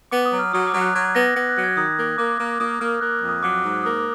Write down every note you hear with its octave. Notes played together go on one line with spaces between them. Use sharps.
B3 D6
D#6
F#3
F6
F#3 D#6
D6
F#3
F#6
F#3 G#6
B3 A#6
B3
F#6
F#3
G#6
D#3 D#6
A#3
A#3 D6
A#3
A#3 D#6
A#3 F6
A#3 F#6
F2
D#6
F#3 D6
G#2
A#3 D#6